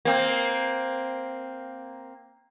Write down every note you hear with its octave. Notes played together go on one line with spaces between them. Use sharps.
A#3 C4